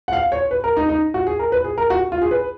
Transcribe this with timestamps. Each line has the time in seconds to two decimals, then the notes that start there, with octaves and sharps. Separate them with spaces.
0.08 F#5
0.13 F5
0.32 C#5
0.51 B4
0.64 A#4
0.77 D#4
0.89 D#4
1.14 F#4
1.27 G#4
1.39 A#4
1.52 B4
1.64 G#4
1.78 A#4
1.90 F#4
2.12 F4
2.22 G#4
2.31 B4